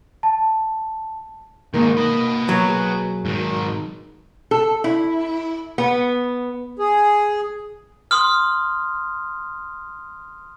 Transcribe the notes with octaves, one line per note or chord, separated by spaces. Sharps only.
A5
D#3 G#3 A#3 D#4 A#4
B4 D#5
B2 F#3
G#4
G#2 D#3
A4
E4
B3
G#4
C6 D#6 F6